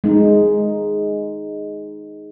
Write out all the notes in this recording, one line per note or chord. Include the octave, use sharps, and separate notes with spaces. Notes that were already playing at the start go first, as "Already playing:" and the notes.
G#3 D#4